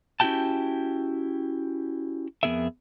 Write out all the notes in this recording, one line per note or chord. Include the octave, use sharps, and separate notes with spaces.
C#4 E4 F#4 G4 G5 A5
F2 F#3 B3 G#4 A#4 E5